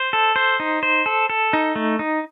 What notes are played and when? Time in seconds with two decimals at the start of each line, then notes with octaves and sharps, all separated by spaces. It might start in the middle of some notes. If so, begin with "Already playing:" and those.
Already playing: C5
0.13 A4
0.36 C5
0.60 D#4
0.83 C5
1.06 A4
1.30 A4
1.53 D#4
1.76 A3
1.99 D#4